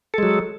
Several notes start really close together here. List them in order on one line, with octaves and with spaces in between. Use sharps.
A4 G#3 F#3